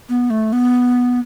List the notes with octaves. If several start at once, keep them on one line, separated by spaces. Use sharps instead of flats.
B3
A3
B3